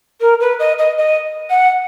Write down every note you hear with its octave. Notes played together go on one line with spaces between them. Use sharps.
A#4
B4
D#5
D#5
D#5
F#5